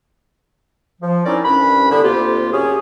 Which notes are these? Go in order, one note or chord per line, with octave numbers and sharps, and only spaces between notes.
F3
C4 C#4 D#4 E4 A#4 D5
C2 G2 C#4 B4 B5
D3 B3 E4
D2 C3 A#3 F4 G4
F#2 C#4 G4 G#4